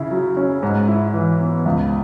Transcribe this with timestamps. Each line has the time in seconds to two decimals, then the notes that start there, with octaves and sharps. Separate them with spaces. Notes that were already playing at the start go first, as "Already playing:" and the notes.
Already playing: C#3 E4
0.11 F#3
0.37 C#4
0.63 G#2
0.88 E4
1.14 E3
1.40 B3
1.66 C#2